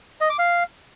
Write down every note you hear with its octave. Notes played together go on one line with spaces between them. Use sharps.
D#5
D6
F5